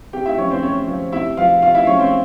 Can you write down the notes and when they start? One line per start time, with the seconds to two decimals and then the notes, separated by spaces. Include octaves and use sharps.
0.13 C3 G4 G5
0.26 E4 E5
0.38 F3 C#4 C#5
0.51 C4 C5
0.63 C3 C#4 C#5
0.88 F3
1.12 C3 E4 E5
1.37 F3 F4 F5
1.62 C3 F4 F5
1.74 E4 E5
1.87 F3 C#4 C#5
2.00 C4 C5